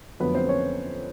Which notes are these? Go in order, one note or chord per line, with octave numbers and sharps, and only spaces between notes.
F2 D3 F#3 A3 B3 B4
C4 C5
C#4 C#5